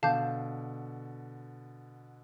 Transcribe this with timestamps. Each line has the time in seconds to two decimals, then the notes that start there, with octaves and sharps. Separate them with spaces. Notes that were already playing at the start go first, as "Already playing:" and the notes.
0.03 B2 D3 F5 A5 D6 G6